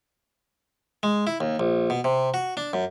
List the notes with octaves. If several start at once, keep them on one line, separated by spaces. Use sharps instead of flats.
G#3
E4
D#2
A#1
B2
C3
F#4
D4
F#2